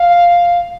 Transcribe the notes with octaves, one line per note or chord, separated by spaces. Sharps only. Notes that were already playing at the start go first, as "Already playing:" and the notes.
Already playing: F5